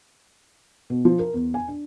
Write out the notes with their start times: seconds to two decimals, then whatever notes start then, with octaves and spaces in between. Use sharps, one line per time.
0.90 B2
1.05 F3
1.19 A#4
1.34 E2
1.54 G#5
1.68 D4